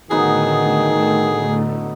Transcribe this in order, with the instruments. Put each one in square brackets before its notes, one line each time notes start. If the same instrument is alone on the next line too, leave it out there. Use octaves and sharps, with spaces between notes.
[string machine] A2 D3 A3 [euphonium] D#3 [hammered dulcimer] F#3 B3 D#4 [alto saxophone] G#4